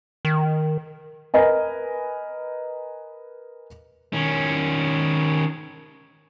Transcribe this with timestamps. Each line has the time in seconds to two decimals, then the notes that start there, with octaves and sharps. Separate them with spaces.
0.25 D#3
1.34 A#4 B4 D#5 G#5
4.13 D#3 C#4